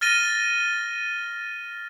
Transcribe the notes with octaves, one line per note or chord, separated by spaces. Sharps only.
F6 A6 A#6 D#7 G7